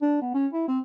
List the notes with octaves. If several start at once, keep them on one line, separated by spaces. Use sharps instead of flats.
D4
B3
C#4
E4
C4